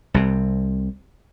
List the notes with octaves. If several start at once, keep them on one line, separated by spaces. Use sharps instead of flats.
C2 C3